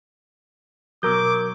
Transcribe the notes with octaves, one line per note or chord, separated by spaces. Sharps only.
B2 F#3 A#4 D6 G6